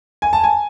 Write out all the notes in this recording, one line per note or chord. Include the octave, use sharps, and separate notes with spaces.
G#5
A5
G#5